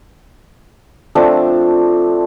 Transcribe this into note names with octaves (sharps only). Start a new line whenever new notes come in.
F3 A3 C4 D4